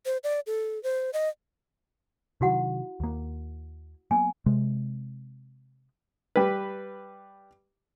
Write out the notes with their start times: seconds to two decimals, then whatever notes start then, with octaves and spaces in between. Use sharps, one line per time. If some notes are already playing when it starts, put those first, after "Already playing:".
0.05 C5
0.24 D5
0.47 A4
0.83 C5
1.13 D#5
2.41 C3 D#3 F#3 E4 F#4 F#5
3.00 D#2 A#3
4.11 F#3 A#3 B3 G#5
4.46 C3 G#3
6.36 G3 B4